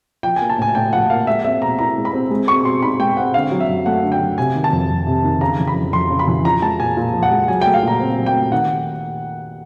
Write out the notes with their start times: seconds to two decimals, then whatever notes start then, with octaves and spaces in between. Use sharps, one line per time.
0.23 F3 G5
0.36 A#3 G#5
0.50 A5
0.58 A2 G#5
0.75 A2 G5
0.92 F3 F#5
1.10 A#3 F5
1.27 G#3 E5
1.44 C4 E5
1.62 B2 A#5
1.79 E4 A#5
1.97 G#3
2.05 B5
2.13 C4
2.31 G#3
2.48 C4 C#6
2.65 B2 C6
2.82 D#4 B5
2.99 G#3 G5
3.17 C4 F#5
3.34 D3 F5
3.51 F#3
3.60 E5
3.69 F#2
3.86 A3 F#5
4.03 D3
4.12 G5
4.21 F#3
4.38 C3 G#5
4.55 D#3
4.64 A5
4.73 F2
4.90 F2
5.07 C3
5.24 D#3
5.41 C#3 A#5
5.58 E3
5.67 B5
5.76 F2
5.93 F2 C6
6.10 C#3
6.19 B5
6.28 E3
6.45 F3 A#5
6.62 G#3 A5
6.79 A#2 G#5
6.97 A#2
7.14 F3
7.23 F#5
7.31 G#3
7.48 F#3 G#5
7.61 A3 G5
7.74 F5
7.83 A#2 A#5
8.00 C4
8.18 F#3
8.26 G5
8.35 A3
8.52 D#3 F#5